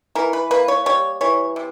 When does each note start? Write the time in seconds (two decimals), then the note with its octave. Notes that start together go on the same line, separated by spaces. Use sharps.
0.15 E3 A#4
0.33 B4
0.51 A#3 B4
0.68 C#5
0.86 G3 C#5
1.21 E3 C#5
1.56 C3